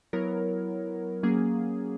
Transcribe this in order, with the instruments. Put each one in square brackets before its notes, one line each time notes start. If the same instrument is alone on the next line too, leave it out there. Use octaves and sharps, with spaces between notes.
[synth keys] F#3 B3 E4 A#4 C#5
F#3 A#3 C#4 G#4